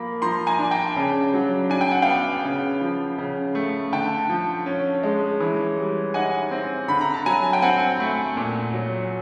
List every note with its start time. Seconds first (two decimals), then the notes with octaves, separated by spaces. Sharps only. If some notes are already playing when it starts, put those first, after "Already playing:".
Already playing: F3 A#3 B5
0.22 F3 A#5 C6
0.46 G#5 A#5
0.59 D4
0.71 G5 A5
0.96 C#3
1.34 F#3
1.70 D4 G#5
1.81 G5
1.92 F#5
2.02 F5 G5
2.08 B3
2.45 C#3
2.81 F3
3.18 C#3
3.55 A3
3.92 D3 G5 A5
4.30 F3
4.66 C#4
5.03 G#3
5.40 E3
5.78 G3
6.14 D#4 F#5 G#5
6.51 C4
6.88 D3 B5
7.01 A#5
7.14 A5
7.26 F#3 G#5 A#5
7.53 G5
7.62 C4 F#5 G#5
8.00 A3
8.37 A#2
8.73 F#3